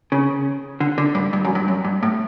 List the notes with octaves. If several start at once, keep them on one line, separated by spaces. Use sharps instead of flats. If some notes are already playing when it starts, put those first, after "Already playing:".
C#3
D3
D3
G2
G2
F#2
G2
F#2
G2
A2